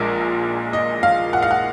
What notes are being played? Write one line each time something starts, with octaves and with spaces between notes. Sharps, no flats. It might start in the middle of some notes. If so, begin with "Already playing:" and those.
Already playing: A#1 A#2 G#3 A#4
D#5
F5
F#5
F5
F#5